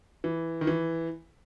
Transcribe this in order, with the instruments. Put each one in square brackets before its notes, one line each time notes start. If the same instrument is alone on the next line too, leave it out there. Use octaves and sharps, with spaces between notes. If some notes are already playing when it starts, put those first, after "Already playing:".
[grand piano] E3
D#3
E3